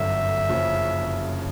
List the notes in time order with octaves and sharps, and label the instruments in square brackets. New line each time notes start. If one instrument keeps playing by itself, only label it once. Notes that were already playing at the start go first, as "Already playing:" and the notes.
Already playing: [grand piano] G1 F#2 D3 F#3 [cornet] E5
[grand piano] F#1 F#2 C#3 F3